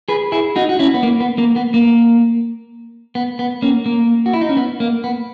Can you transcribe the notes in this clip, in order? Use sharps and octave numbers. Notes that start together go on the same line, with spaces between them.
G#4 B4
E4 G#4
D#4 F#4
F#4
C#4 E4
B3
A#3
B3
A#3
B3
A#3
B3
B3
A#3 C#4
A#3
F#4
E4
D#4
C#4
B3
A#3
B3